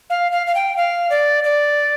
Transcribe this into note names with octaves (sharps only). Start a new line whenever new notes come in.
F5
F5
F5
G5
F5
D5
D5